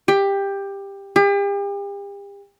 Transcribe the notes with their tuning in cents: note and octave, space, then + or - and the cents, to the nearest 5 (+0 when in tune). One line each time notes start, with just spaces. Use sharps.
G4 +15
G4 +40